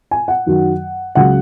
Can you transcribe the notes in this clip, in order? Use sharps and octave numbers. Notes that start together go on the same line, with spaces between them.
G#5
F#5
F#2 D#3 F#3
C#2 C#3 F#3 F#5